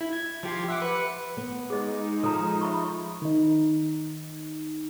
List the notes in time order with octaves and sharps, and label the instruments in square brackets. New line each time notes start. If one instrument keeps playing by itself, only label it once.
[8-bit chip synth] E4
G#6
F3 G4 C6
E5 F#5 D6
B4 C#7
[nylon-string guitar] B3
[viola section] G#3 D#4 [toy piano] G#4 D#5
[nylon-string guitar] F3 [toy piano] A4 A#5
[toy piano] E5 B5 C#6
[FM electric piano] D#3 D#4